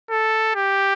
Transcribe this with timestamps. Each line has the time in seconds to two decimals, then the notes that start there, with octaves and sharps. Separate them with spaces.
0.11 A4
0.55 G4